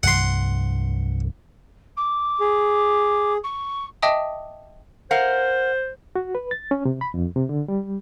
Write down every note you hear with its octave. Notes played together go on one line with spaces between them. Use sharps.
C2 G2 F3 F#5 C6
D6
G#4
C#6
D#5 E5 G5 A5 D6 D#6
A#4 C5 F5 F#5
F#4
B4
A6
C#4
C3
B5
F2
C3
D3
G3